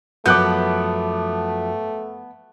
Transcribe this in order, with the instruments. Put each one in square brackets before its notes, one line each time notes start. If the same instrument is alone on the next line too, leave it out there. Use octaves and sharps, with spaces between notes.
[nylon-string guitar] F#2 F3 F#4 [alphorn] A3 [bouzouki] B3 [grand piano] D6 F#6 G6